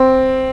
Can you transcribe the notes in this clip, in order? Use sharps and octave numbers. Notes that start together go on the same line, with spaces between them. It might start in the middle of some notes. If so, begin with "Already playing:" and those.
Already playing: C4